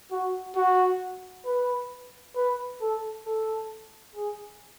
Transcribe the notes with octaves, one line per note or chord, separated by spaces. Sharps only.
F#4
F#4
B4
B4
A4
A4
G#4